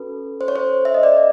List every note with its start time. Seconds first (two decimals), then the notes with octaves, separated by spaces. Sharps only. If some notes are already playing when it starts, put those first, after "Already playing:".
Already playing: C#4 F#4 A4 B4
0.41 C5
0.48 C#5
0.56 C5
0.85 E5
0.94 D#5
1.03 D5